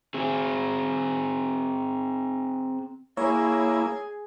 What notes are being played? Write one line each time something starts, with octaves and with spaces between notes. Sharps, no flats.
C4 G#4
A#3 E4 G#4 C#5